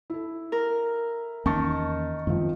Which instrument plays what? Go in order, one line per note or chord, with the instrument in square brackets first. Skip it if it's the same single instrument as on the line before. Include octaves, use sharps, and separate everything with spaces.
[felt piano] E4 A4
[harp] A#4
[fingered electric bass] E2 A#3 C#4 [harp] D#3 [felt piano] A5 C#6 A6
[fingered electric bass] F#2 D#3 [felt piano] F3 C4